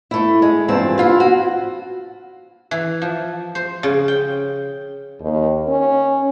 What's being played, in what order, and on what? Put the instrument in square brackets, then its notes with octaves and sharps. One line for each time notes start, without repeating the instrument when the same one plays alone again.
[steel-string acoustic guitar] A3 E4
G#3
G2 C3 E3 F3 C4 A5
E4 F4
F#4
[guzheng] E3
F3
C5
C#3
G5
[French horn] D#2
C#4